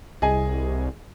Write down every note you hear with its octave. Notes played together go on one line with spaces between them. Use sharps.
C2 G#4 D#5 G#5